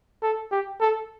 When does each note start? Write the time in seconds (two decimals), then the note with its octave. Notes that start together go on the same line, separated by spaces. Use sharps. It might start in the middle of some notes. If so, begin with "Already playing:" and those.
0.22 A4
0.51 G4
0.81 A4